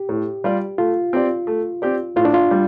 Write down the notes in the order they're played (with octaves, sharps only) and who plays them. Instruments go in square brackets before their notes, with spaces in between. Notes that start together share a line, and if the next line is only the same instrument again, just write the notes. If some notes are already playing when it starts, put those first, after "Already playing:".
Already playing: [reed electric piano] G4
[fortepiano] A2
G3 F4 D5
[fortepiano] A3 [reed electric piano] F4
[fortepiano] C4 G4 D5
A3
C4 G4 D5
[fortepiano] A2 [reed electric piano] F4
[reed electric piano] D4
F4
[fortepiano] G3